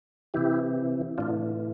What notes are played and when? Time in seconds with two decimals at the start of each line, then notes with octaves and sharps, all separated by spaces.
0.34 C3 E3 E4 G4
1.18 A2 E3 D4 F4